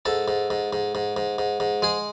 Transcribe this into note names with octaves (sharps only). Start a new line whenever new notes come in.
G#2 A4
G#2
G#2
G#2
G#2
G#2
G#2
G#2
G#3 G#4